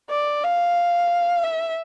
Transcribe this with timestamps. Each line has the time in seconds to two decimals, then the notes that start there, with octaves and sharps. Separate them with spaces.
0.10 D5
0.44 F5
1.44 E5